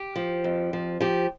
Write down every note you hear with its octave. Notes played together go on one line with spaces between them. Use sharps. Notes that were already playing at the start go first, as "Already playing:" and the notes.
Already playing: G4
F3
F2
F3
F3 G4